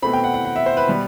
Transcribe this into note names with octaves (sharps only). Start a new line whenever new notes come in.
B2 A3 C4 B5
G5
F#5
F#5
F#5
E5
C5
B4
B2 G3 B3